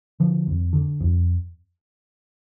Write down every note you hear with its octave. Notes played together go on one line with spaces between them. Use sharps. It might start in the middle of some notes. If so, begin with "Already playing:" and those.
D3 F3
F2
D3
F2